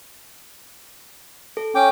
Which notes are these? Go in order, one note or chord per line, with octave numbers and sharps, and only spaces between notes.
A4
C#4 G5 D6